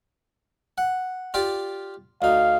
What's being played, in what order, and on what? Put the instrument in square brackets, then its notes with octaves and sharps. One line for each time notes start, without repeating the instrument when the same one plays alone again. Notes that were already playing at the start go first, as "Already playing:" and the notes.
[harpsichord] F#5
F4 G4 D5
[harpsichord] D2 D#4 [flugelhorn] F5